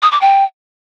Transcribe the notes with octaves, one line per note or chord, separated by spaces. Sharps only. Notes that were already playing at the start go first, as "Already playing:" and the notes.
D#6
D6
G5